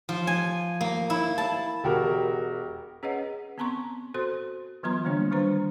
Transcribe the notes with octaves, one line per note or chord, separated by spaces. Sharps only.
F3
G#5
A#3
E4
A5
E1 F#4 G4 A#4
C#4 G#4 B4 C#5 D#5 F#5
B3 C4 A5 A#5 C6 C#6
F#4 A4 C5 C6
E3 F#3 B3 F4 A#5 C6
D3 G3 A#3 D4 C#5
D#3 G3 D4 B4 C5 A#5